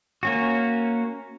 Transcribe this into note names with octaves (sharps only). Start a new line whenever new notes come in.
A#3 C#4 F#4